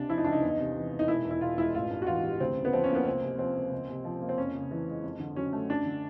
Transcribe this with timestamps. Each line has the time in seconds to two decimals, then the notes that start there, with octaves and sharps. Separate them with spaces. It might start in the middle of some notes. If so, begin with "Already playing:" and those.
Already playing: C#2 C3 D4
0.09 F3 E4
0.17 D#4
0.24 C#2 D4
0.32 D#4
0.42 E2
0.59 C3
0.76 E3
0.93 G#3
0.99 D#4
1.08 E1 E4
1.25 E2
1.31 E4
1.41 B2 F4
1.57 G#3 E4
1.75 A1 F4
1.90 G2
2.02 F#4
2.07 E3 F4
2.23 G3
2.40 D2 C4
2.57 C#3
2.65 B3
2.73 F3 C4
2.84 C#4
2.90 A#3 B3
3.06 C#2 C4
3.23 C3
3.39 F3 C4
3.56 A#3
3.72 C#2
3.89 C3
4.04 F3
4.21 A#3
4.29 C4
4.37 F2 C#4
4.54 C#3
4.71 E3
4.88 G#3
5.03 F2
5.20 D3
5.36 F#3 C#4
5.53 A3
5.70 F#2 D4
5.86 D3